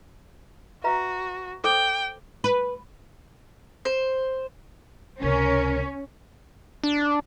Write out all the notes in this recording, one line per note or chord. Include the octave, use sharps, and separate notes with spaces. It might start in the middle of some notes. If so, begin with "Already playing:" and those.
F#4 B4 E5 A#5
A4 C5 G5 D6
B4
C5
C#2 C3 C#4 A#4
D4